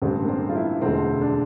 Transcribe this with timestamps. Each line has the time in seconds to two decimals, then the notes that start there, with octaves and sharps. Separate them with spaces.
0.02 A1 G2 D3 C4
0.24 A#3
0.29 C4
0.49 F4
0.55 E4
0.81 E1 D2 D3 C4
1.21 D4